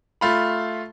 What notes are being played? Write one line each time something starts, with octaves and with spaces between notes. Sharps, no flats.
A3 F4 B5